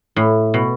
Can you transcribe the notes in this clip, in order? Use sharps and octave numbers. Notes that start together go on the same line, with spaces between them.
A2
B2